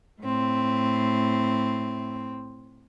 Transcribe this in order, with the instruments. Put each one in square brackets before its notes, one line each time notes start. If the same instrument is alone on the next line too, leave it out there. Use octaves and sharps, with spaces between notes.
[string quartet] A2 C4